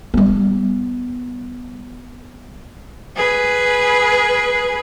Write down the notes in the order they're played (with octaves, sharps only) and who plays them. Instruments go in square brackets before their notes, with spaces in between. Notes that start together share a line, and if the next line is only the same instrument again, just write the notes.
[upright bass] G3 B3
[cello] G#4 B4